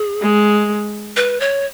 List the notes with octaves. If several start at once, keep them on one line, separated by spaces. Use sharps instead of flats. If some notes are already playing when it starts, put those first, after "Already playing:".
Already playing: G#4
G#3
B4
C#5